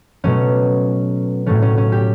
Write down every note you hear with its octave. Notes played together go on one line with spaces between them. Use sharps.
B2 F#3 A3 C#4
A2 F#3 A3 C#4
C#4
C#4
G4